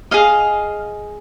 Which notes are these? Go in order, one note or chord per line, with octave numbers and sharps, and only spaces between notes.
G#4 D#5 F5